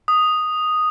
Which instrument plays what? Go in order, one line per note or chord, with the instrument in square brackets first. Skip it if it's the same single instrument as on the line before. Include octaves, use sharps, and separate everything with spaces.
[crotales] D#6